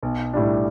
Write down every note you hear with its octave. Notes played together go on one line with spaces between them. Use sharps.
B1
A2 G3 D4